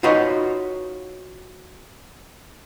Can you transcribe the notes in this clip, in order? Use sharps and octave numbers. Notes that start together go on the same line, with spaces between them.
D#4 F4 F#4 B4 C#5 D#5